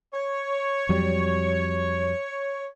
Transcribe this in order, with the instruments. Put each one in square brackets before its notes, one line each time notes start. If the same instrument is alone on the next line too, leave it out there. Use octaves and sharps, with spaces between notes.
[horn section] C#5
[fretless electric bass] F2 F#3 G3